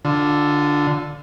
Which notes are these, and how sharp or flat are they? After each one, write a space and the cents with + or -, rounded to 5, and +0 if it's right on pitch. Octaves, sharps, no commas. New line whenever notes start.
D3 +0 F4 +25